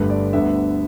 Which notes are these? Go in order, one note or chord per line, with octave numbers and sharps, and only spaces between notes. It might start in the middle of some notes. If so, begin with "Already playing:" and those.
Already playing: G1 G2 D3 A3 B4
D5
D2 D3 G3 B3 E5